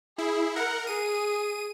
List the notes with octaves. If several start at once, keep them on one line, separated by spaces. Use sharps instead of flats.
E4 G#4
A#4 F#5
G#4 D#7